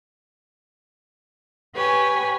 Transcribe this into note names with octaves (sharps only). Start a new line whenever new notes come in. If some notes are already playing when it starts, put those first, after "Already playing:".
G4 B4 C#5 G#5